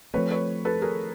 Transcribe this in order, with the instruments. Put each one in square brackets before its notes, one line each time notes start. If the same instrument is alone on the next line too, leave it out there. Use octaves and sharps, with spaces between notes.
[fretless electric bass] F3 A3 C4 [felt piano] B4 C#5
[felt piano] B4 C#5
A4 B4
G#4 A#4